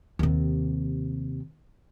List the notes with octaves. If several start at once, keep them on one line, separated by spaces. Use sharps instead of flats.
D#2 C3